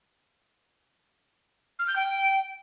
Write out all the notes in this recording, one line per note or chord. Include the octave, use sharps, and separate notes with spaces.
F6
G6
G5